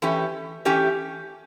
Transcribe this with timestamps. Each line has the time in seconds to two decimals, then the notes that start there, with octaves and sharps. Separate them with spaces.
0.02 E3 A3 C#4 G4
0.65 E3 A3 C#4 G4